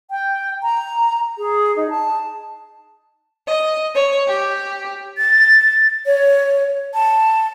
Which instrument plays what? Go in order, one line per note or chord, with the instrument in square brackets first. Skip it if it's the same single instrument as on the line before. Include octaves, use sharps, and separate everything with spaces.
[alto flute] G5
A#5
G#4
D#4
A5
[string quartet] D#5
C#5
G4
[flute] A6
C#5
A5